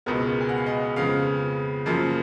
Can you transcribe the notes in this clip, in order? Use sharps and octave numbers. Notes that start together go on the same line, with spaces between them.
C#2 B2 G#3 B3 A#4
G#5
F#5
F5
D#5
F2 C#3 G#3 B3 F5
F#2 C#3 F3 A#3 F5